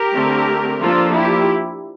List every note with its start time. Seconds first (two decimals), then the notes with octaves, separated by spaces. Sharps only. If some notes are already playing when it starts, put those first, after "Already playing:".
Already playing: G4 A#4
0.14 D3 A3 C4
0.81 F3 A#3 D4 F4 A4
1.15 E4 G4